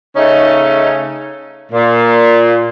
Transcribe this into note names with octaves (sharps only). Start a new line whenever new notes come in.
C#3 A3 C#4 D#4
A#2